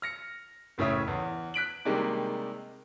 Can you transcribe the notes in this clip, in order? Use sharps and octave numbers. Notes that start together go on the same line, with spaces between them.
F6 A#6 C#7
F#1 A2 C#3 C#5 E5 D#6
E2
F#6 B6 D7 F#7
C3 D#3 G3 G#3 A#3 D4